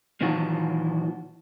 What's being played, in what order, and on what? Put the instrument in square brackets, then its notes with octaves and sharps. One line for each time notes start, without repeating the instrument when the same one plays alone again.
[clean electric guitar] A#2 D#3 E3 F#3 F4 F#4